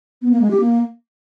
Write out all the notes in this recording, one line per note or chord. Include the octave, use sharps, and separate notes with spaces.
B3
A#3
G#3
G4
A#3